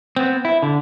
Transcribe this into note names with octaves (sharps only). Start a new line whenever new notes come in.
B3 C4
E4
D3